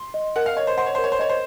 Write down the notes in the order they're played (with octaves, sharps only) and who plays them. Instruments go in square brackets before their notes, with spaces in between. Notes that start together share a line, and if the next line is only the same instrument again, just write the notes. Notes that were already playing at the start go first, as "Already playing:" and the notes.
Already playing: [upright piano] C6
[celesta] D#5
[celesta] A#4 [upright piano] F#5
[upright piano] F5
[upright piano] C#5 [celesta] D#5
[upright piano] C5
[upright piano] C5 [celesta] F#5
[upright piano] C#5
[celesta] A#4 [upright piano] C5
[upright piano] C#5
C5
[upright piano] C#5 [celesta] D#5
[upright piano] C5